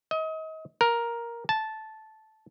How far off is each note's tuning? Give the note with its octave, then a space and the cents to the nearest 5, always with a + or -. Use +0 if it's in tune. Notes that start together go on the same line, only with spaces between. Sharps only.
D#5 +30
A#4 +5
A5 -10